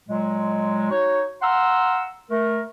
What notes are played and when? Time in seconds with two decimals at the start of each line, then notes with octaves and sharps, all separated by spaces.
0.09 A#2 F#3 G#3
0.91 D#4 F#4 C#5
1.42 F5 F#5 A#5 C6 E6
2.30 A3 A#4